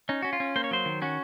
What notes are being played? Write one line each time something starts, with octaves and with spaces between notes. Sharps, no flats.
C#4 D#4
C#4 F#4
F4
C#4
A#3 C5
C#5
F#3 C5
D#3
C#4 F#4